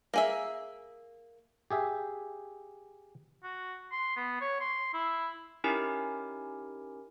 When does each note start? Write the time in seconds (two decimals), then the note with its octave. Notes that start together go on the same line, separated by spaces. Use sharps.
0.14 A#3 G#4 E5
1.71 G4 G#4 E5
3.43 F#4
3.92 C6
4.16 B3
4.41 C#5
4.60 C6
4.94 E4
5.64 C#4 D#4 E4 G4 A#4 G#5